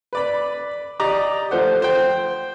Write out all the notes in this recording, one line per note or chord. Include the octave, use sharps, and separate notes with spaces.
B4 D5 B5
G4 D5 D#5 A#5 D6
F3 A3 C5 F#5
C5 G5